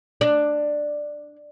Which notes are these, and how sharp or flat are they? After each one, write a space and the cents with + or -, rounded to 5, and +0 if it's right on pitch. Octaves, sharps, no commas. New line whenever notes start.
D4 +10